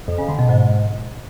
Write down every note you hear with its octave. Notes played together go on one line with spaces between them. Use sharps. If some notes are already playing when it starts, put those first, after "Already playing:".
F2
C#3
D3
B2
G#2